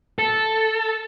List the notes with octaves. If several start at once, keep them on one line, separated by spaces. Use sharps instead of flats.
A4